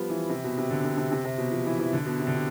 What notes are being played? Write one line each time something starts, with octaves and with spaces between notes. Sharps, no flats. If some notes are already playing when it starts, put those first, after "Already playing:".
Already playing: F3 G3 B3
E3
C3
B2
C3
D3
C3
C3
C3
C3
B2
F3
E3
E3
D3
B2
C3
D3
C3